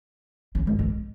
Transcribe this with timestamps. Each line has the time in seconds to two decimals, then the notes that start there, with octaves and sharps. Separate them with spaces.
0.55 C#3
0.67 G#2
0.79 G#2